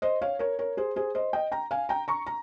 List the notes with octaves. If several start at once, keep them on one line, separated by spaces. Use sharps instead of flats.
C5 D#5
C#5 F5
A#4 C#5
A#4 C#5
G#4 C5
G#4 C5
C5 D#5
D#5 G5
G5 A#5
F5 G#5
G5 A#5
A#5 C#6
A#5